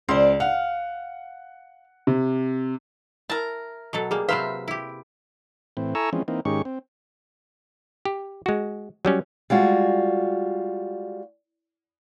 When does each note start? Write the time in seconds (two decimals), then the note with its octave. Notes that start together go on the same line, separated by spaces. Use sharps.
0.09 C#2 C5 D5
0.40 F5 F#5
2.07 C3
3.30 E4 A#4 A5
3.93 B2 F#3 A4
4.11 G3 A#3 G#4
4.29 C3 F#3 B4 C5 E5 F5
4.68 E4 G4
5.77 A2 E3 C4
5.95 E4 A4 G#5 A#5 C#6 E6
6.13 E3 F3 G#3 C4 C#4
6.28 E3 A#3 C4 D#4
6.45 G#2 D#3 G#3 C#4 G4 C#6
6.65 C4
8.05 G4
8.46 G#3 F#4
9.05 F#3 G3 C#4
9.50 G3 G#3 F4 F#4